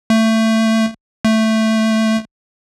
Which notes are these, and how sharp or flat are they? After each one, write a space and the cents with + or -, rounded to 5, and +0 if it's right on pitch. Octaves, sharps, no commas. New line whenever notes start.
A3 +20
A3 +5